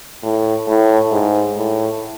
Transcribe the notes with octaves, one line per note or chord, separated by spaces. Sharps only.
A2
A2
G#2
A2